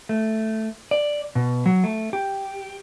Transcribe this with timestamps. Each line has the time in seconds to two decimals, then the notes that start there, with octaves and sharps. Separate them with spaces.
0.09 A3
0.91 D5
1.35 B2
1.66 F#3
1.84 A3
2.13 G4